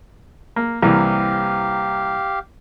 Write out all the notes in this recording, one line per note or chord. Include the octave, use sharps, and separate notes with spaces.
A#3
C2 E3 A#3 G4 F5